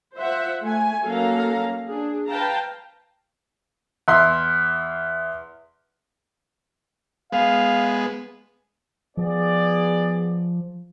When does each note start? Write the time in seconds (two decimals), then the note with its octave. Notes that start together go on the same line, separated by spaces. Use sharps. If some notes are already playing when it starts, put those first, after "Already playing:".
0.17 F4 C5 E5 F#5
0.62 A3 G#5
1.03 F#3 A#3 C#4 A4 F5 A#5
1.86 D4 G#4
2.27 B4 F5 G5 A5 A#5
4.08 E2 E5 C6
7.32 G#3 B3 F5
9.17 F3 B3 G#4 D5